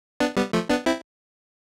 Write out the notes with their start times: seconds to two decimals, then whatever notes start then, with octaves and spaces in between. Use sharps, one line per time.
0.20 B3 D4
0.37 G3 B3
0.53 F3 A3
0.69 B3 D4
0.86 C4 E4